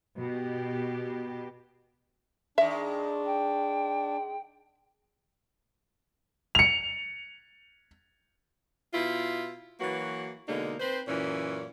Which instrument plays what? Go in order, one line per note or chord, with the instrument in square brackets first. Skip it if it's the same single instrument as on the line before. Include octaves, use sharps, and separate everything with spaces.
[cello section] B2 G4
[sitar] D#3 G#3 [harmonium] D4 [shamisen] E5
[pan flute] G5
[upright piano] C#7 F7
[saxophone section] B2 E4 F4
E3 F#3 A#3 F#4 B4
B2 D3 G#3 A#3 D#4
C4 B4 C5
F#2 A#2 E3 C#4